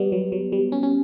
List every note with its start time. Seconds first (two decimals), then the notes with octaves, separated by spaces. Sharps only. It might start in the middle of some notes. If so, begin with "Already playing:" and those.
Already playing: G3 B3
0.12 F#3
0.32 F#3
0.52 G3
0.72 C#4
0.83 C#4